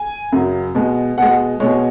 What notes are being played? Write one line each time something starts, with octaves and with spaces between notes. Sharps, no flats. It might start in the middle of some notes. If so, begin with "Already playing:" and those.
Already playing: G#5
F#2 C#3 F#3
B2 G#3
B2 G#3 F#5
B2 G#3 C#5